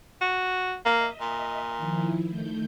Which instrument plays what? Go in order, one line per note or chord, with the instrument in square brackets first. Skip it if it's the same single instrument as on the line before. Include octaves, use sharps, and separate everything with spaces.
[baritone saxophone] F#4
[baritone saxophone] A#3 [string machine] D#5 E5
[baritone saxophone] A#2
[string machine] D#3 F3 E4
D#3 A3 G6